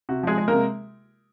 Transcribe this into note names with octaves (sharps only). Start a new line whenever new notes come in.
C3 F#4
F3 G#3 G#4
G#3
C3 A#3 A#4